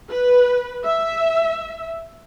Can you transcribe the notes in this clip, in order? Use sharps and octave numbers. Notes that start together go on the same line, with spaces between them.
B4
E5